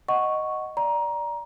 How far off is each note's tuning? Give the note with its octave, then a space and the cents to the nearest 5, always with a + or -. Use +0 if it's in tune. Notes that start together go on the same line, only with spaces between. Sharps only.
D#5 +0 F#5 +0 C#6 +0
D5 +0 A#5 +20